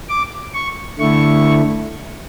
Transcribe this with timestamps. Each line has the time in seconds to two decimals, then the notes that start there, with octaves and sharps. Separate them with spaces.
0.09 D6
0.54 C#6
0.99 D3 A3 E4 C#6